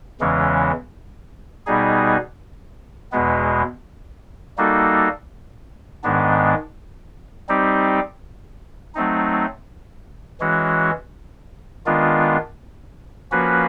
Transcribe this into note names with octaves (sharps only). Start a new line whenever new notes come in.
E2 C#3 E3 G#3 C#4
B2 G3 B3 D#4 G#4
E2 B2 G#3 B3
G3 A#3 D#4 F#4 A4
G#2 D#3 G#3 B3 D4
G3 C4 D#4 G4
F#3 A3 C4 D#4
E3 G#3 C#4 F#4
D#3 G#3 B3 D4 F4
F3 A#3 C#4 F#4 B4